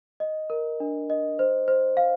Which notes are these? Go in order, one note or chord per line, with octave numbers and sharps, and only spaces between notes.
D#5
A#4
D4
D#5
C5
C5
F5